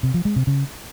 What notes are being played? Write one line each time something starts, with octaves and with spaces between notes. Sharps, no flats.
C3
F3
G#3
C3
C#3